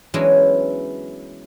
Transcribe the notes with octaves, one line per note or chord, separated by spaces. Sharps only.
E3 F#3 G#3 B3 C#4 D4